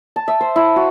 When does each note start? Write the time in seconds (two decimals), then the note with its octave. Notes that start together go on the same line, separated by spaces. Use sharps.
0.16 A5
0.28 E5
0.41 C5
0.56 E4
0.76 F#4